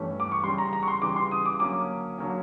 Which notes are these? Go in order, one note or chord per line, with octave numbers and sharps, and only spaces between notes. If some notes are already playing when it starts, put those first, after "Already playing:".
Already playing: G2 E3 A3 C#4
D6
C#6
C#3 E3 G3 C6
A#5
A#5
C#6
C6
C#3 E3 G3 D6
C6
D#6
D6
D3 F#3 A#3 C#4 D6
D3 F#3 A#3 C#4